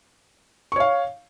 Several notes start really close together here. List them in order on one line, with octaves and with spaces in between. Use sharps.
C#6 C#5 F5